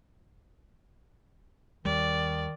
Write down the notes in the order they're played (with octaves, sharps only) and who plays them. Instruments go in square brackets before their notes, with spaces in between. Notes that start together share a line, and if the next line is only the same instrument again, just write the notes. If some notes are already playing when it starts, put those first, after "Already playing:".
[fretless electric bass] D#2 G3 [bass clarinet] D#3 [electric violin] D5